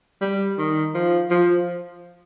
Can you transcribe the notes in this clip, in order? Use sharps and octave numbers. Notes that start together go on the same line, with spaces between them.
G3
D#3
F3
F3